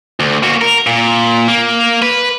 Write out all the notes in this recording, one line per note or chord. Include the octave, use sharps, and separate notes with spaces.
D2
A#3 F#4
A#4
A#2
A#3
B4